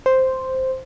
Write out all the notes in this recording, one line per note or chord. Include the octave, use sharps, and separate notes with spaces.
C5